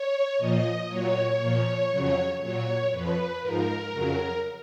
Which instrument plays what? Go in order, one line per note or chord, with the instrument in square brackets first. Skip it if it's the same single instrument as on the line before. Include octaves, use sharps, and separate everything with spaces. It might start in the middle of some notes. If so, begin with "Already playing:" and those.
Already playing: [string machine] C#5
A#2 F3 D#5
A#2 F#3 C#5
A#2 F3
F2 C#3 F#3
A#2 F#3 C#5
F2 F3 B4
G#2 F3 A#4
F2 C#3 F#3